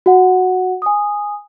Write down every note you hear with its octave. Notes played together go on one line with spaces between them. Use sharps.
F#4 F#5
G#5 D#6